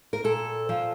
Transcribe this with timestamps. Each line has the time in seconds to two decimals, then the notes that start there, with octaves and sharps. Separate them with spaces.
0.13 A#4
0.24 A#2 A4
0.69 F3